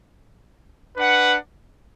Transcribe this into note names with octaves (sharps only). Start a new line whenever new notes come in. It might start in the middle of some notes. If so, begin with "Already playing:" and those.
D4 B4 F#5